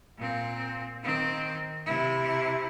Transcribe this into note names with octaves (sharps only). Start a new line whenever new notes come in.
A#2 C4
D#3 C4
C3 E4